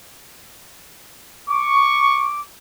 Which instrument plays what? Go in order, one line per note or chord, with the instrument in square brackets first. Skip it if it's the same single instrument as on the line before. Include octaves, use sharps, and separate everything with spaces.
[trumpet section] C#6 [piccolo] D6